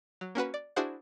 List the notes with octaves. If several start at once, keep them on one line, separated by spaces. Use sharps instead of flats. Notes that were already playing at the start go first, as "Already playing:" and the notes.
F#3
A#3 C#4 F#4 B4
D5
D4 E4 F#4 G#4 C5 F#5